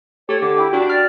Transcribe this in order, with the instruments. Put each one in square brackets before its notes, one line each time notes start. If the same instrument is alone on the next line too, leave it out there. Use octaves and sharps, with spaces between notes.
[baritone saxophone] A3 [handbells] G4 [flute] C#5
[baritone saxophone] D3 [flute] D6
[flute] E4 [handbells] G5
[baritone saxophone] D4 [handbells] F#4 [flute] G5
[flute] D5 [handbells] F6